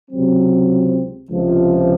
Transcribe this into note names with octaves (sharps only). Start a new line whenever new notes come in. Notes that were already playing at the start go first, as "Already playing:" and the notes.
C#2 C3 F#3 C4
C#2 C3 F3